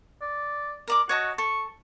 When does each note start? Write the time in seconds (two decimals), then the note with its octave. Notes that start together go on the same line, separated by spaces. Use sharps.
0.22 D5
0.88 A#4 D5 D6
1.09 F#4 C#5 D#5 A5
1.38 A4 C#6